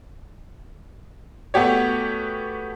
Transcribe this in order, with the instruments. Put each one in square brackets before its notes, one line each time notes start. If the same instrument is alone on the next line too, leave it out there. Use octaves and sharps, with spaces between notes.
[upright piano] A3 B3 F#4 G4 C#5